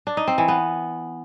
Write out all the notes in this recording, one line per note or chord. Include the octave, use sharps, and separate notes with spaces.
D4
D#4
C4
E3
B3